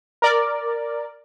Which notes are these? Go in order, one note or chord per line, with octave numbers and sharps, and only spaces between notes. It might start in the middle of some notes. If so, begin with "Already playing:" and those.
A#4 D5